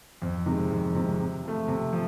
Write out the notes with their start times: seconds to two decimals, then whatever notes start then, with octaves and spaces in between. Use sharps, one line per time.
0.22 F2
0.46 C3 D#3 G#3
0.70 F2
0.95 C3 D#3 G#3
1.19 C3
1.44 F3 A3
1.68 C3
1.93 F3